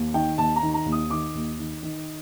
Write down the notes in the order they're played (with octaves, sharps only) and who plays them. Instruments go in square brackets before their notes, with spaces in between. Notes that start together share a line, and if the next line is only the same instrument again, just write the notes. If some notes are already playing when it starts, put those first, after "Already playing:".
Already playing: [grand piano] D#2
D#3 G5
D#2 A5
A#5
D#3
A#5
D#2
D#6
D#3 D6
D#2
D#3
D#3